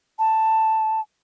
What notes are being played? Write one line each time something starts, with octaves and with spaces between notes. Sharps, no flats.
A5